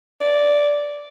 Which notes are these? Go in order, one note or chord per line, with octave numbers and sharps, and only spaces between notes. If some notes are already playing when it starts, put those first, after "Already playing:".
D5